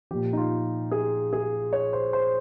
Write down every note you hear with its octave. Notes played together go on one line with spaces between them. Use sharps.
A#2 F3 G4
D#4
F4
G#4
G#4
C#5
C5
C5